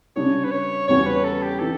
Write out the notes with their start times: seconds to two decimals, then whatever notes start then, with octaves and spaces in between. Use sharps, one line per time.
0.16 C#3 G3 D4 G4 C#5
0.44 B4
0.51 C#5
0.88 E2 C#3 G3 C#4 F#4 C#5
1.07 B4
1.24 A4
1.43 G4
1.59 E3 G3 D4 A4